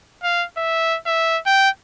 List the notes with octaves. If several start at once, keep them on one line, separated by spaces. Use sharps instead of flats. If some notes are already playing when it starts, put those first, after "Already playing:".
F5
E5
E5
G5